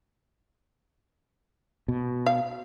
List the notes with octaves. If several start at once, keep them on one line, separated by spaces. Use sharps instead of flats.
B2
F5